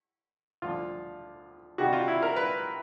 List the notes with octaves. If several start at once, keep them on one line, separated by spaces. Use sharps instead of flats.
D2 D3 F3 F4
C3 D#3 G3 F#4
F4
E4
A#4
B4